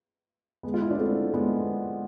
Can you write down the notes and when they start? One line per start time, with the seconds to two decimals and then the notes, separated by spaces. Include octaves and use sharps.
0.63 G#3 B3
0.74 F4
0.81 E4
0.91 D4
0.98 A3 C4
1.34 G#3 B3